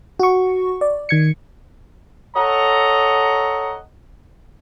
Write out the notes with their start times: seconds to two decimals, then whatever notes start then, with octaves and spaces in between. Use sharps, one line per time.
0.19 F#4 C#6
0.81 D5
1.09 D#3 G#6 C#7
2.34 A4 C#5 D#5 F#5 A#5